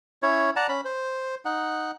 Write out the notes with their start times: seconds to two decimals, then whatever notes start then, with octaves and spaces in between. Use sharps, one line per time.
0.23 C#4 E4 C#5
0.56 D5 F#5 A5 A#5
0.69 C#4 B5
0.85 C5
1.45 D#4 F#5